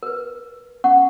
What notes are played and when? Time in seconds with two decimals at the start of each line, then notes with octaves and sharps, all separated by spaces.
0.03 A#4 B4
0.84 C#4 F#5 C#6